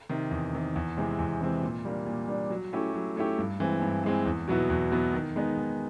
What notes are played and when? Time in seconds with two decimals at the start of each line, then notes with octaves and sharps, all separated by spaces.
0.09 C3 D#3
0.31 E2
0.53 C3 D#3
0.76 E2
0.97 C3 E3 G#3 C4
1.19 E2
1.41 C3 E3 G#3 C4
1.62 A#2
1.85 G3 A#3 D4
2.07 A#2
2.28 G3 A#3 D4
2.50 F#3
2.73 A3 C#4 E4 G4
2.94 F#3
3.16 A3 C#4 E4 G4
3.39 G2
3.60 E3 G#3 C4
3.82 G2
4.04 E3 G#3 C4
4.26 E2
4.48 B2 F#3 B3 E4
4.70 E2
4.92 B2 F#3 B3 E4
5.13 D#3
5.36 G#3 B3 D#4
5.57 D#3